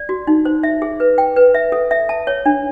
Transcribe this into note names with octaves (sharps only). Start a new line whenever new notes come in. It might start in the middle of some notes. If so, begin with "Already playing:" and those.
Already playing: D5
F#4
D#4
C5
E5
G#4
B4
G5
B4
E5
A4
E5
A5
C#5
D4